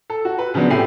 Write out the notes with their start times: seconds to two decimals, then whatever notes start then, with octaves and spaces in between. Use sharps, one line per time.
0.10 A4
0.25 F#4
0.39 B4
0.54 C#3 F3 F#3 B3 D4
0.70 A2 C3 G4 G#5 C7